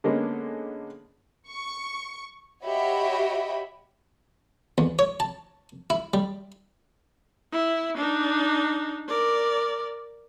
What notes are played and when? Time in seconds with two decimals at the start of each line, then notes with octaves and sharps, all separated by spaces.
0.04 D3 G#3 A#3 B3 C#4
1.48 C#6
2.64 F#4 G4 C#5 D#5 E5 B5
4.78 E2
4.99 C#5
5.20 A5
5.90 E4
6.14 G3
7.52 E4
7.97 D4 D#4
9.08 A#4 D5